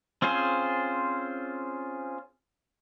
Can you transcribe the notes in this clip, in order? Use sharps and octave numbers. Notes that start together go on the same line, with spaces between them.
C4 C#4 F4 G#4 C5